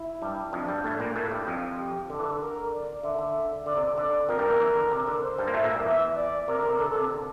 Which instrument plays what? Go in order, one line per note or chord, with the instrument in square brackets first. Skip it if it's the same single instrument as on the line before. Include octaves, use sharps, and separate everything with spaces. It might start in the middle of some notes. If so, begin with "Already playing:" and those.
Already playing: [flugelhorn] E4
[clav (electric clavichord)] G2 G3
[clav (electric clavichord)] F2 F3 [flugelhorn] D4
[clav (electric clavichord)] G2 G3
A2 A3
A#2 A#3
[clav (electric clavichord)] A2 A3 [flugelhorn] E4
[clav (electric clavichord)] G2 G3
[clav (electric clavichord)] F2 F3 [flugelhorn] F4
[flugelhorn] G4
[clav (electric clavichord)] D3 [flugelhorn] A4
[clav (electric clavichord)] E3
D3
[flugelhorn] A#4
D5
[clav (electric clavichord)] D3 [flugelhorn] E5
[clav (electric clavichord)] D3
[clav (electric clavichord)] D3 [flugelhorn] D5
[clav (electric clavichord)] C3
D3
[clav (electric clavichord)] D3 [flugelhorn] D5
[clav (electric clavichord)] F2 F3 [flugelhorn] A#4
[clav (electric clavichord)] G2 G3
E2 E3
E2 E3
D3
C3
D3
[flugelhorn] C5
[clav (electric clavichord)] G2 G3
A#3
[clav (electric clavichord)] A2 A3 [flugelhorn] E5
[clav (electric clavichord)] A#2 A#3
G2 G3
[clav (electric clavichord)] E2 E3 [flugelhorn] E5
[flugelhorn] D5
[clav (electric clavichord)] C3 [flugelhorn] A#4
[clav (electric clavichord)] D3
C3
[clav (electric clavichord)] D3 [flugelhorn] A4
[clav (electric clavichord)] C3
D3